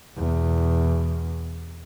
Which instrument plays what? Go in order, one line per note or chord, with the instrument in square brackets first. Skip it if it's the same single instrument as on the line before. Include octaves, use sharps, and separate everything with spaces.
[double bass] E2 B2